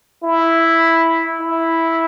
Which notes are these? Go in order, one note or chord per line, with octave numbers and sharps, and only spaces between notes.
E4
E4